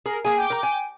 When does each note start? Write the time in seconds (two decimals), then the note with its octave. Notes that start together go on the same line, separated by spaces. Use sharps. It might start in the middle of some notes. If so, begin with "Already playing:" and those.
0.06 G#4 A#4
0.25 A#3 G#4 G#5
0.37 G5 D6
0.50 A#4 A#5
0.63 G#5